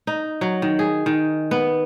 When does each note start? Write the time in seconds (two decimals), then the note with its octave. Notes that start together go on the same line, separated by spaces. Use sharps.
0.07 D#4
0.41 F#3
0.62 D#3
0.79 G#4
1.06 D#3
1.51 B3